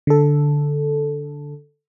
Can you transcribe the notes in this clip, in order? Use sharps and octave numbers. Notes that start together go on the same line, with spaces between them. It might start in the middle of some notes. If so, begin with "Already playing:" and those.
D3 A4